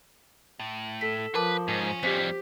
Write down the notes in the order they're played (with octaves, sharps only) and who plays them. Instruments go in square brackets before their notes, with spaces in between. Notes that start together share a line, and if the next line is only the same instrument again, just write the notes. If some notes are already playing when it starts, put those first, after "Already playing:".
[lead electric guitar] A2
[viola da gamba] A4 [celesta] B6
[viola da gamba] F3 [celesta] A#4 A5 D6 [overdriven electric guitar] B4
[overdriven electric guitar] G#2 [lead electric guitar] C#4
[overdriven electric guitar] F2 G3 [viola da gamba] G4 [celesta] C5 B6